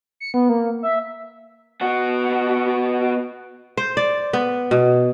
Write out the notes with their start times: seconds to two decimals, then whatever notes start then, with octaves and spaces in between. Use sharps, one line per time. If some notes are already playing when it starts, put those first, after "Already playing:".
0.20 C#7
0.34 B3
0.49 A#3
0.83 E5
1.81 B3 F#4
3.77 C5
3.97 D5
4.33 B3
4.71 B2